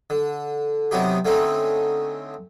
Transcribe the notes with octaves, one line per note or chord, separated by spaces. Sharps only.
D3
C3 F#3 B3 D#4 G4
D3 A3 C4 C#4 D#4